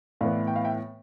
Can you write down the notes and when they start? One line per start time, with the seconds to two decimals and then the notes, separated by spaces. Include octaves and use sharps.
0.21 A2 E3 B3 D5 F5
0.47 G5
0.56 F5
0.64 E5 G5